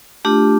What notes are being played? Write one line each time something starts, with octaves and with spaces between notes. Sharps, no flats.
A3 D4 F4 G4